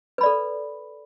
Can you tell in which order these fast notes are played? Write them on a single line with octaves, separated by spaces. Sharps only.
B4 B5 D5 A4